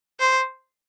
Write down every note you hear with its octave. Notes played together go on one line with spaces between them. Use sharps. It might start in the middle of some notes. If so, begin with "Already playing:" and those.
C5